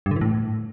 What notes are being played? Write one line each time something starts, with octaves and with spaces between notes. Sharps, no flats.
G2
D3
E3
A2